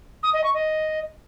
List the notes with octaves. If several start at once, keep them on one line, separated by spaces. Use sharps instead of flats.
D#6
D#5
C#6
D#5